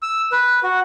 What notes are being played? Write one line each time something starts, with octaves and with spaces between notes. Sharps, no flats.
E6
B4
F#4